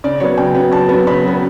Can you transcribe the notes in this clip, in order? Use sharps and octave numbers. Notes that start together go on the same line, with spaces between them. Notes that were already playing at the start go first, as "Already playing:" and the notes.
C#3 D5
F#3 B3 C#5
C#3 G5
F#3 B3
C#3 A5
F#3 B3
C#3 B5
F#3 B3